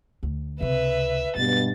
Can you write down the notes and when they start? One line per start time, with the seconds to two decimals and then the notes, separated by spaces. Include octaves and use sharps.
0.23 D2
0.61 C#2 C3 B4 E5
1.36 G2 B2 G#3 A6